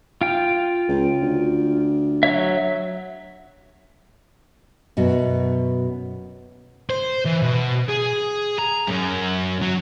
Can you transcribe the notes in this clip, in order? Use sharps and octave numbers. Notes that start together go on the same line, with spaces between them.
F4 G5
C#2
D2
F#3 C#5 E5
F#2 B2 F#4
C5
E3
B2
G#4
A#5
F#2
F#3